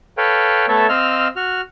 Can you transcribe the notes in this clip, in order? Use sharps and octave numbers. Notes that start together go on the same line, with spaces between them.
A4 B4 C#5 F5 G5
A3 B3 A4 C#5 E5 A5
C4 D#5 F5 E6 F6
F#4 F6